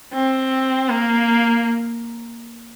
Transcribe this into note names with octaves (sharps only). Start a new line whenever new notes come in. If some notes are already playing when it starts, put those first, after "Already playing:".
C4
A#3